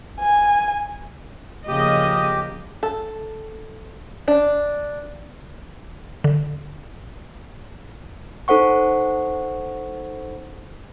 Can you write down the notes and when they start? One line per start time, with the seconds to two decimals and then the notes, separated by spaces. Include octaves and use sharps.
0.20 G#5
1.68 C#3 F3 A#3 G4 D#5
2.83 A4
4.28 D4
6.24 D3
8.48 D#4 A4 C5 F#5 C#6